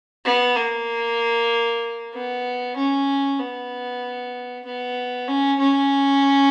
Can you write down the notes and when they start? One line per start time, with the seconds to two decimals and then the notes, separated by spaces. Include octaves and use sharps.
0.25 B3
0.56 A#3
2.13 B3
2.76 C#4
3.39 B3
4.65 B3
5.28 C#4
5.59 C#4